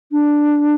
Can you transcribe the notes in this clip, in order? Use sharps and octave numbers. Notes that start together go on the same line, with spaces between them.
D4